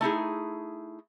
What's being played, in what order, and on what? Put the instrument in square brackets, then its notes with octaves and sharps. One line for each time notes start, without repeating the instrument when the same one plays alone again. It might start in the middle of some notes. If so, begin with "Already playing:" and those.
[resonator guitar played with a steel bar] A3 D#4 E4 G#4